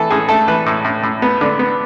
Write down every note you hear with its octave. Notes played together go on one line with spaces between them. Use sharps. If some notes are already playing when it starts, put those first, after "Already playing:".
Already playing: E3 A4
A2 G#4
A3 A4
E3 B4
A2
A2
A2
B3
D3
B3